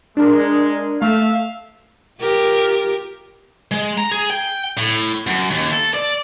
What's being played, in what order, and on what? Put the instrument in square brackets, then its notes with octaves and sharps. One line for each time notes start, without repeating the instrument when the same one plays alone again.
[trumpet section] G#3 [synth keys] D4 A#4
[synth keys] A3 [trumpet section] E5 F5
[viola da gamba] F4 G4 A#4
[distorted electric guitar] G#3
A#5
G#4
G5
A2
F#2
D#2
A4
D5